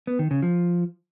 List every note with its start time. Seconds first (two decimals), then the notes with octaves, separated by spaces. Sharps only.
0.07 B3
0.19 D#3
0.31 C#3
0.42 F3